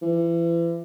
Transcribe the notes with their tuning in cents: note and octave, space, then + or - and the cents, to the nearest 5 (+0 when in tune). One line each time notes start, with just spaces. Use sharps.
E3 +35